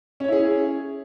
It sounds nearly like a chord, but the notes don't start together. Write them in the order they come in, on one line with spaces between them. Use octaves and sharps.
C#4 C#5 E4 G#4